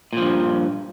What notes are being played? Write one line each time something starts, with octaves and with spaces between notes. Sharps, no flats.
G2 A#2 F3